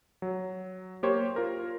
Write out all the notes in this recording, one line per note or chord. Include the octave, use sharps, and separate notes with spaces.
F#3
A#3 G4 C5 C#5
F4 A#4